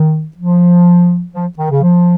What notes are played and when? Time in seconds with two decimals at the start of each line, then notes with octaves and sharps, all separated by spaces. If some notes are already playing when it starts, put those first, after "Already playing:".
Already playing: D#3
0.37 F3
1.34 F3
1.58 D#3
1.70 C#3
1.82 F3